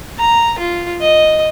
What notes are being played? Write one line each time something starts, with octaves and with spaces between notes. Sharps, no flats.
A#5
F4
D#5